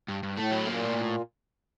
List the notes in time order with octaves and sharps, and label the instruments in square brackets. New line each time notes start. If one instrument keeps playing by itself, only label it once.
[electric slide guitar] G2
G2
[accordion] A2 [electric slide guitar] A3
[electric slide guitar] F#3
[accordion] A#2 [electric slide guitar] A#3
[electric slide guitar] A2